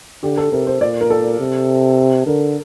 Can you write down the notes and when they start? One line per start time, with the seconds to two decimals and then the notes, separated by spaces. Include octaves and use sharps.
0.23 D3 G4
0.37 A4
0.52 C3 A#4
0.67 C5
0.81 A#2 D5
1.01 A#4
1.10 A4
1.40 C3
2.26 D3 A#4